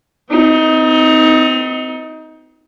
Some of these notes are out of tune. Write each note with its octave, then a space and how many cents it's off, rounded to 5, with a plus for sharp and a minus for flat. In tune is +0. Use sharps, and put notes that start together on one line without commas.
C4 -30 D#4 +20